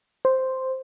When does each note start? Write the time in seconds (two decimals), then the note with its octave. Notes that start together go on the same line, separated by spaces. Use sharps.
0.25 C5